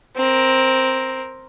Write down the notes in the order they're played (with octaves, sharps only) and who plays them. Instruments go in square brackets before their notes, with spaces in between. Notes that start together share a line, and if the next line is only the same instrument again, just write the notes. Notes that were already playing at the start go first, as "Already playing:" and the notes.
[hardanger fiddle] C4 A#4